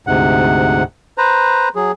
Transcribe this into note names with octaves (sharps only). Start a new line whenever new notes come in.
D2 G#2 C3 F#5
B4 C5 A#5
F#3 G#4